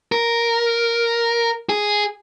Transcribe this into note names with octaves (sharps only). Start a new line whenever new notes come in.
A#4
G#4